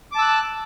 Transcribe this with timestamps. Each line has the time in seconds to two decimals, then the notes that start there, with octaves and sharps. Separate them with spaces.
0.12 D6
0.15 A5
0.18 E6
0.22 F#6